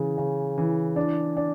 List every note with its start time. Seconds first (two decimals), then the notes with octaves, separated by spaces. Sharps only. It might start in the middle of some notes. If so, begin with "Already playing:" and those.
Already playing: C#3 E3
0.18 C#3
0.58 E3
0.96 D4
1.37 D4